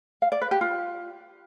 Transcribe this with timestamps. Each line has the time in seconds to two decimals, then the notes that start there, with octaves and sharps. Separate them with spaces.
0.22 F5
0.32 D5
0.41 B4
0.51 G4
0.61 F4